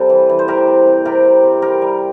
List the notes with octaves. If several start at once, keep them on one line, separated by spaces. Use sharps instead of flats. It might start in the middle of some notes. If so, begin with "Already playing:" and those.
Already playing: C3 G3 A4
E3
E3
C5
C3 G4 A#4
C3
C3
C3 G4 A#4
C3
C3
G3 G4 A#4
G3